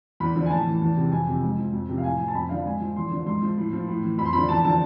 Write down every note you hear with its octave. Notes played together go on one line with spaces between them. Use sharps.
E2 B5
D3 F3
G#5
A2 A5
E3
E2
C3 E3
F2 G#5
C3 F3
G#2
F3
F2
C3 F3
F5
A2 G#5
F3 G#5
A5
F2 B5
D3 F3 F5
G#2 G#5
F3
E2 C6
D3 F3
G#2 C6
F3
A2
F3
A2
E3
F2 B5
C6
D3 F3 B5
E2 A5
D3 F3 A5